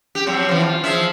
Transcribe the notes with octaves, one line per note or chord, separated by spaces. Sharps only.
G4
F3 F#3 C4
E3 F3
F4
F3 G#4 E5